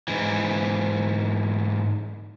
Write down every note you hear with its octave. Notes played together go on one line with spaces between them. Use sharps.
G#2 E3